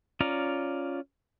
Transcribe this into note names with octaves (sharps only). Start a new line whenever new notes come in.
C#4 F4 D5 A#5